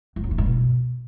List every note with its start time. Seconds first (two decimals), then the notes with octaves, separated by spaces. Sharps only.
0.16 F2
0.24 F#2
0.31 E3
0.38 G2
0.46 B2